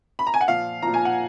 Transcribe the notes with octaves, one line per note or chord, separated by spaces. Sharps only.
B5
A#5
G#5
F#5
A#2 F3 F5
A#2 F3 A#5
G#5
F#5